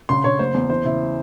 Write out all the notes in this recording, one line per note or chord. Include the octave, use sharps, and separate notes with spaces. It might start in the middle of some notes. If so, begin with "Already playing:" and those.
C#3 C6
C#3 C#5
F#1 C5
E2
E3 C5
C#3 E4